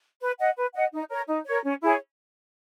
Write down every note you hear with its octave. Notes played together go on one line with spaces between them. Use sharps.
B4
D#5 F#5
B4
D#5 F#5
D#4
A#4 C#5
D#4
A#4 C#5
C#4
E4 G#4 C#5